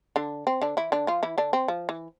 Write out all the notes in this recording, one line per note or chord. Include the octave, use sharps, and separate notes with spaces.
D3 D4
C4
D3 D4
E3 E4
D3 D4
F3 F4
E3 E4
D3 D4
C4
F3
E3